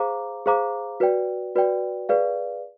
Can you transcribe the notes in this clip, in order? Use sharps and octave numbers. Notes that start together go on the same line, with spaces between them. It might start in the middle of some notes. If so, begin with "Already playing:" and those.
Already playing: G#4 C5 F5 A#5 D6
G#4 C5 F5 A#5 D6
F#4 B4 D5 G5
F#4 B4 D5 G5
G#4 B4 D5 F5